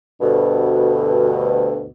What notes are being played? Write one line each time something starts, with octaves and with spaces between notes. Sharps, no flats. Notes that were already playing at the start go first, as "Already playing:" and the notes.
D2 G2 B2